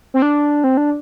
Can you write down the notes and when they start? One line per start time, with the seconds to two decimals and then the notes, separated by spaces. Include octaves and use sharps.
0.14 C4
0.22 D4
0.64 C4
0.77 D4